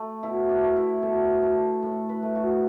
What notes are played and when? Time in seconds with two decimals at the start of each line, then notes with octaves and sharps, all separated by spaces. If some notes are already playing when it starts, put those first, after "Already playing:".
Already playing: A3
0.23 B2 E4
0.49 D4
0.63 A3
0.76 E4
1.02 B2 A4
1.42 A3 A4
1.83 A2
2.09 B4
2.23 A3
2.35 F#4